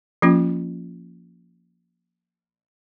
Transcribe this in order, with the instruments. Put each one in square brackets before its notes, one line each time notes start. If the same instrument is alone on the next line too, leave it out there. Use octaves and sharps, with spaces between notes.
[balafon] F3 A#3 C#4 F4